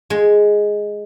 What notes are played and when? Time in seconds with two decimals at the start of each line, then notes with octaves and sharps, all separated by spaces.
0.10 G#3